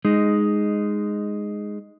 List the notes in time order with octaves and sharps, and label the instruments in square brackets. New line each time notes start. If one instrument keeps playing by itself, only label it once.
[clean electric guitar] G#3 D#4